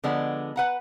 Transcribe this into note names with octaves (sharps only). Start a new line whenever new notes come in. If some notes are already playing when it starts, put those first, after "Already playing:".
D3 F3 G#3 B3 D5
B4 F#5 A#5